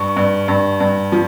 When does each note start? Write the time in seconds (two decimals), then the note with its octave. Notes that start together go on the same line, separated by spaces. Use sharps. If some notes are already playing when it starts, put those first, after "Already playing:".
Already playing: G2 C#6
0.17 G2
0.48 G2
0.80 G2
1.12 F3